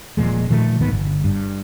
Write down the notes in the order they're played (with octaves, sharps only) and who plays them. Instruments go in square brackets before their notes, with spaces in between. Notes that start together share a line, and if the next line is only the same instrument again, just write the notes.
[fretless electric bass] D#1 A#2 F3 G#3
A#2 D#3 F3 A3
C2 G#2 D#3 B3
G1
G2